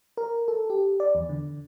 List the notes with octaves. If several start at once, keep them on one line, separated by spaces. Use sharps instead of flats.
A#4
A4
G4
D5
E2
D3